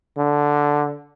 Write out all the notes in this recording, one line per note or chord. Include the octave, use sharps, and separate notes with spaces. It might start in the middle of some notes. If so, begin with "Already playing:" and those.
D3